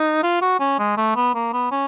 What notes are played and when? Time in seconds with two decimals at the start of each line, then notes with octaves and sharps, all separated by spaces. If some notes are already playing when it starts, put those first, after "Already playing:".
Already playing: D#4
0.23 F4
0.42 F#4
0.60 C#4
0.79 G#3
0.97 A3
1.16 B3
1.34 A#3
1.53 B3
1.72 C#4